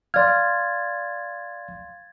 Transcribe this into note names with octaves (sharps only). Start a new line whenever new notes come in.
D5 F5 C6 F6 G#6 A6